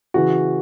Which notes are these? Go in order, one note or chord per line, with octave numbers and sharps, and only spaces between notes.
C#3 E3 F#4